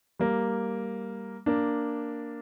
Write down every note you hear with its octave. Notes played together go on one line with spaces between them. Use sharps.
G3 A#3
A#3 D4